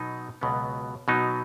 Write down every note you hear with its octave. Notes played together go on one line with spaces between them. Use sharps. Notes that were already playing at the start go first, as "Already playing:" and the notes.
Already playing: B2 F#3 B3 D#4
C#2 B2 F#3 B3
B2 F#3 B3 D#4